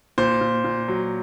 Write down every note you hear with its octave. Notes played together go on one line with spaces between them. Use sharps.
A#2 C5
A#2
A#2
F#3